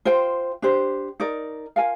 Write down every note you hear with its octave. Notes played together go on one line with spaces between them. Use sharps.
F4 C5 G5
D4 G4 C5
D#4 A#4 D5
F4 A#4 F5 G#5